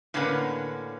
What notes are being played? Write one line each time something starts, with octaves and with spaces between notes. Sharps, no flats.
A2 D3 A#3 C#4 B4 F#5